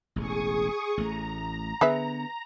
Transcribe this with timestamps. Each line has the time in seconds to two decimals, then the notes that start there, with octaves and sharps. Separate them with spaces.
0.16 E1 A1 G#4 C#6 D#6
0.97 A1 A3 A#5
1.81 D3 B3 G#4 B4 E5